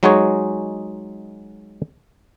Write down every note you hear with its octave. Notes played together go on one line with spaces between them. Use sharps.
F#3 G#3 D#4 F#4 G#4 C#5